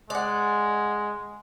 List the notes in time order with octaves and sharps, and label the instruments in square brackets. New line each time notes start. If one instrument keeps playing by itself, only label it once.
[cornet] G#3 [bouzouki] D5 F#5